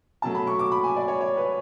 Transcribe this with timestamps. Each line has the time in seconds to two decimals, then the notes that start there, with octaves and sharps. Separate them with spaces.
0.22 B2 F#3 A3 A5
0.35 B5
0.47 C#6
0.59 D6
0.72 B5
0.84 G#5
0.96 D5
1.08 C#5
1.21 C#5
1.37 B4